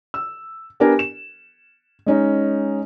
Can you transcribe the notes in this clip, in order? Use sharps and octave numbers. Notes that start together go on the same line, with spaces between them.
E6
B3 D4 G4 A#4 G#5
E7
G#3 C#4 D#4